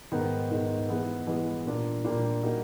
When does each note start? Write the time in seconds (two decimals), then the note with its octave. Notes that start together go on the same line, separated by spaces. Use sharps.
0.12 G#2 D#3 G#3 B3 D#4
0.51 G#2 D#3 G#3 B3 D#4
0.89 E3 G#3 B3 E4 G#4
1.27 E3 G#3 B3 E4 G#4
1.65 A#2 G3 A#3 D4 F4
2.04 A#2 G3 A#3 D4 F4
2.42 G3 A#3 D#4 F#4